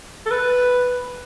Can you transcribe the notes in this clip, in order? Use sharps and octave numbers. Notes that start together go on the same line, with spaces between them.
A4
B4